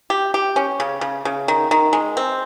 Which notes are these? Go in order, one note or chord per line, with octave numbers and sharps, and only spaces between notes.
G4
G4
C#4
C#3
C#3
C#3
D#3
D#3
G#3
C4